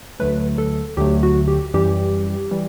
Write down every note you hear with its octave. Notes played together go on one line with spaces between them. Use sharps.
D2 D3 F#3 A3 B4
A4
D2 D3 F#3 A3 G4
F#4
G4
F#2 E3 G3 G4
E3 G3